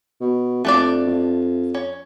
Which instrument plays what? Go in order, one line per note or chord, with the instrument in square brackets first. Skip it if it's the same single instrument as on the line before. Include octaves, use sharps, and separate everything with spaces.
[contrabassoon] B2
[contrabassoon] F2 [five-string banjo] A3 D4 D5
[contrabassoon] F2
[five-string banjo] C#4